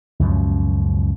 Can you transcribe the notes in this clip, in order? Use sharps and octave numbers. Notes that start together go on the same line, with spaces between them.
C#2 F#2 B2 F3